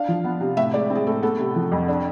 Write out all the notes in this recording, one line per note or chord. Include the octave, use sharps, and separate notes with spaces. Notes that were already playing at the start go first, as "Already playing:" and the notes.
Already playing: D4 F5
F3
B3
C3
A2 E5
G#3 D5
C4
G#4
A2 A4
B3 A4
C3
F3
F2
D4